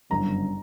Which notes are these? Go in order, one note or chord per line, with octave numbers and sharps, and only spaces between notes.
G1 F#2 C#3 A#5